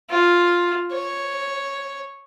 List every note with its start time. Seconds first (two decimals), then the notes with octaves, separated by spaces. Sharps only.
0.10 F4
0.92 C#5